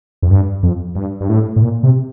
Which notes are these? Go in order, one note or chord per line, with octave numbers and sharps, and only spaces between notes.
F2
G2
F2
G2
G2
A2
A2
A#2
C3